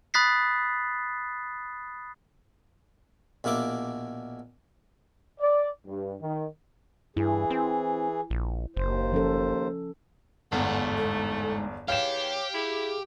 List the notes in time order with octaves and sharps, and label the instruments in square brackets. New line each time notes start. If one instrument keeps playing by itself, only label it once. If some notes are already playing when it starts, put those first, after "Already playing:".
[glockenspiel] B5 D#6 F#6 A6 B6 C7
[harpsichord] A#1 B2 A#3 E4 D6
[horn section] D5
G2
D#3
[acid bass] G2 [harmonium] E3 G#4 [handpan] E4
[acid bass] C4
A#1
[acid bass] F#1 [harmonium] D#2 C5
[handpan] F3 C#4 A4
[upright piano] G1 E2 [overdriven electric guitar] G#2 [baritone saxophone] A3 [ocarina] F#5
[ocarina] A4
[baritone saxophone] E2 [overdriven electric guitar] G4 [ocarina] C#5 [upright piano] F5 E7
[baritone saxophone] E4 [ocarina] G#4